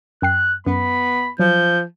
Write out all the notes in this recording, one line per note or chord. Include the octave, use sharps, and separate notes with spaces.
F#2 G5 F#6 C7
F#2 B3 B5
F3 F#3 G6